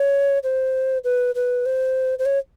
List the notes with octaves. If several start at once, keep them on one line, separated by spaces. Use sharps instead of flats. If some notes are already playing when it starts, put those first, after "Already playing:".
Already playing: C#5
C5
B4
B4
C5
C5
C#5